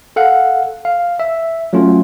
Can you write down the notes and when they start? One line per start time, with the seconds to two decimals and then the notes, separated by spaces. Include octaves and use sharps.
0.16 A4 F5 F#5
0.85 F5
1.20 E5
1.73 F#3 A3 C#4 F4